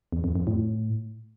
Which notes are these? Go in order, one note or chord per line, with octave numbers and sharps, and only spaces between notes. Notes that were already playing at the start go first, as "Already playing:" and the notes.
E2
F2
F2
A2